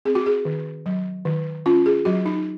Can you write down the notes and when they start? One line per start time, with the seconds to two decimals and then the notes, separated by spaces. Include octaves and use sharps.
0.05 C4 G#4
0.15 F#4
0.26 G#4
0.45 D#3
0.86 F#3
1.25 D#3
1.66 C#4 F4
1.86 G#4
2.05 F#3 F#4
2.25 D#4